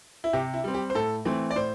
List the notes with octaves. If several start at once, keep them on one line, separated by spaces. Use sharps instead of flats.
E4
C3 G4
E4
G3 C4
G4
C5
A2 A4
E3 A3 C4
D5
A2 C5